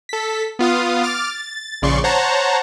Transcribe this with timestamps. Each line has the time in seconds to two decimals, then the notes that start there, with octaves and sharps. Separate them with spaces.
0.09 A4 B6
0.59 B3 F4 F5 D#6
1.03 D6 F6 A6
1.30 A6
1.82 A#1 C#3 D5 C6 C#6
2.04 C5 C#5 F#5 A5 A#5